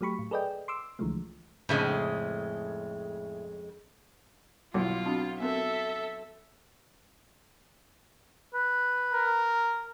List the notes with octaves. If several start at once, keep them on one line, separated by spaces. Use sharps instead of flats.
F#3 A3 G4 B5 C#6
A2
G#4 A4 B4 D5 D#5 G5
C6 D6 E6
C2 D3 E3 F3 G#3 A3
F2 A2 C#3 G#3
B1 E4 F4 D6
C4 D4 F#4
B3 C4 A4 A#4 E5
B4
A#4